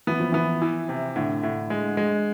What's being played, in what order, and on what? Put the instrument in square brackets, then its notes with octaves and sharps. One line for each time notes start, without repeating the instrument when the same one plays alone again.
[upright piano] E3 [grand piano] B3
[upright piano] F3
[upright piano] E3 [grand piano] B3
[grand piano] E3
C3
[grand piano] A2 [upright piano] D3
[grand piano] A2
G#3
G#3